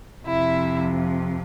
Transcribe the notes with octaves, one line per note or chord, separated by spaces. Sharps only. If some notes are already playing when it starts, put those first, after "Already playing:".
F2 C3 F3 E4 E5